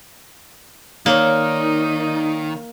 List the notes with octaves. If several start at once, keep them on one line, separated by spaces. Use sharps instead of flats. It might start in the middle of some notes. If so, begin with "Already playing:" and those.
D#3 A#3 D#4 A#4 C#5 D5